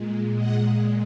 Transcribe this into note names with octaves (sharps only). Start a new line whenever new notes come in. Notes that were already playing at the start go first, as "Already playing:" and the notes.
Already playing: A#2 G#3
D#5 F#5